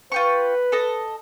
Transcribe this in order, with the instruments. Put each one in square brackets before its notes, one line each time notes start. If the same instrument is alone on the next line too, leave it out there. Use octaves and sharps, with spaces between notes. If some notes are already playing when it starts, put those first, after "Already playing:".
[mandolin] F4 G5 C#6 [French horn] B4
[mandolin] A4 D#5